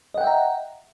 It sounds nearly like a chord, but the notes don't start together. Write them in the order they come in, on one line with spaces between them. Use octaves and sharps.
D#5 F#5 G5 E5 A#5